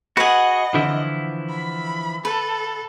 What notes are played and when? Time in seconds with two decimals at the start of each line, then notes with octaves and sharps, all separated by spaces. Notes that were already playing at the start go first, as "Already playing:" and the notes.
0.17 F#4 G#4 B4 D#5 F#5
0.74 D3 E3 F3 E4
1.50 B5
2.25 A4 B4